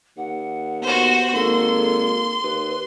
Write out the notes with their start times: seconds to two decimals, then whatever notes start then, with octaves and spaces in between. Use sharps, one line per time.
0.17 D#2 F#5
0.82 B3 F#4 C5
1.33 G#1 A#3 A4 C6
2.43 D#2 B4